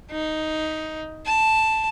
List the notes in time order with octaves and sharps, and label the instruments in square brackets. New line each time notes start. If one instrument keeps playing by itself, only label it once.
[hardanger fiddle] D#4
A5